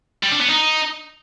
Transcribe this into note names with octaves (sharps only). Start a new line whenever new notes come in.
G3
D4
B3
D#4